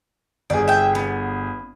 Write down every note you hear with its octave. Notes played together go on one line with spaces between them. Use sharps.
G1 G#4 D5
E5 G5
B3